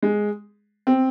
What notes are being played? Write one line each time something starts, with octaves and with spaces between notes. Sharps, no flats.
G#3
C4